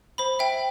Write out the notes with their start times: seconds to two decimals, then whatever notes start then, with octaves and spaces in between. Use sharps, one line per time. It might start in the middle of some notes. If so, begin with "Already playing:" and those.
0.18 C5 B5
0.39 E5 G5